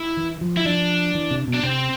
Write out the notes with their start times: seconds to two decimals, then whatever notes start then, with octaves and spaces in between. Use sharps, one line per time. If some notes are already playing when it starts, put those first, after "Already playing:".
Already playing: E4
0.17 E3
0.41 F3
0.57 E4
0.65 F3 D4
1.15 E3
1.31 C3
1.47 B2
1.54 D4
1.63 C3 C4